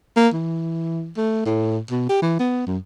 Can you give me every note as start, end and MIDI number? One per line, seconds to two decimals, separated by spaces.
0.17 0.29 58
0.34 1.12 52
1.17 1.45 57
1.46 1.80 45
1.91 2.05 47
2.09 2.20 67
2.22 2.37 52
2.40 2.65 59
2.67 2.78 42